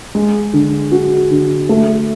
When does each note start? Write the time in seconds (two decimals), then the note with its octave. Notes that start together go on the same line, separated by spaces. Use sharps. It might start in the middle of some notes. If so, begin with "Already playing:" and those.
0.15 G#3
0.53 D3
0.92 F#4
1.30 D3
1.69 A3